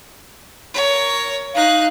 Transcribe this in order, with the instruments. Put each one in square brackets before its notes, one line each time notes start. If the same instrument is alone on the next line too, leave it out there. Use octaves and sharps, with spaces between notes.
[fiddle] A#4 C#5
[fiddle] D#4 F#6 [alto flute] F5